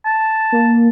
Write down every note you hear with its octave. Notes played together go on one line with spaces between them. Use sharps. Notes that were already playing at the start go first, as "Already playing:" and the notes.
A5
A#3